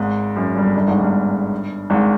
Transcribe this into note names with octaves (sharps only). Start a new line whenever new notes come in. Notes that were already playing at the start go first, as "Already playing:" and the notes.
Already playing: G#1 G#2
F#2
G1 G2
G1 G2
G#1 G#2
G1 G2
G#1 G#2